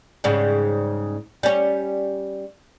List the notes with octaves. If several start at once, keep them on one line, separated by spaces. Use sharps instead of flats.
G#2 C#3 G3
G3 C#4